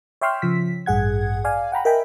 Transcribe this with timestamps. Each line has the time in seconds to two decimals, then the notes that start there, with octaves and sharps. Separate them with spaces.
0.21 C#5 E5 G5 C6 E6 F6
0.42 C#3 F3 B6
0.86 A1 G2 G#4 F#5 G#6
1.44 D5 F5 G#5
1.72 F#5 G5 A#5 B5
1.85 A#4 D#5 E5 G5 G#5 B5